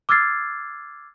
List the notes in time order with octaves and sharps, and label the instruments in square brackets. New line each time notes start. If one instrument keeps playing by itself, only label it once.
[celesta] D6 E6 F6 G#6 A6 C7